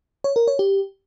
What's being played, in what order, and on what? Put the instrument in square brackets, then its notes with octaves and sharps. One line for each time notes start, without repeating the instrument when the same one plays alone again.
[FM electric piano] C#5
A#4
C#5
G4